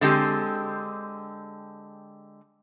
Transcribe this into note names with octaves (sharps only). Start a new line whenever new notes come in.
D3 G#3 C4 G4